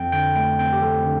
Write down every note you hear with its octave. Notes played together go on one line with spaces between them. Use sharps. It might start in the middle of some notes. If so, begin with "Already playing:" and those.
Already playing: F2 G5
D3 G5
A3 G5
C4 G5
G4
F2 A4
D3